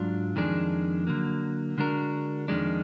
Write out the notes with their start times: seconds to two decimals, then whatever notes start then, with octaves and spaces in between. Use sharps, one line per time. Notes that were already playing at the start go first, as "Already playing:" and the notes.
Already playing: G#2 F#3 D4 F4
0.36 F2 D#3 G#3 D4 G#4
1.07 D3 F#3 A#3
1.78 D3 G#3 D4 F#4 A#4
2.48 F2 D#3 G#3 D4